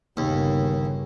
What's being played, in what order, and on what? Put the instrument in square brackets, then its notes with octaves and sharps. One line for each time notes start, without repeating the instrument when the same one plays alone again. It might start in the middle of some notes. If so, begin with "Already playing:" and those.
[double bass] G1 C#3 [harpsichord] D#2